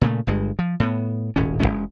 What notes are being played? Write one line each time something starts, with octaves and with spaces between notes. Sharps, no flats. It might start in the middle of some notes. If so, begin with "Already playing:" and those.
A#2 C#3 G3 A3
G1 G2 G#3
F3
A2 B3
D#1 G#1 A2 C#4
E1 F#2 G#3 C#4